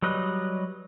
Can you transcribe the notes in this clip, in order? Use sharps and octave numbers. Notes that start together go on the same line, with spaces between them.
F#3 G3 B4 D#5 F#6